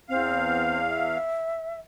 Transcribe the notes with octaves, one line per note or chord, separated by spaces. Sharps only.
E2 C4 F5
E5